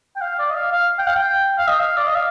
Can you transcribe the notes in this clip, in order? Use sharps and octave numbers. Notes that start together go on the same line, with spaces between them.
G5
F5
D5
D#5
F5
F5
G5
F5
G5
F5
D#5
F5
D5
D#5
F5